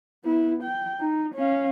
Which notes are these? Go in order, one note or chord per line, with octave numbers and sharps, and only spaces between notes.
B3 E4
G5
D#4
C#4 F5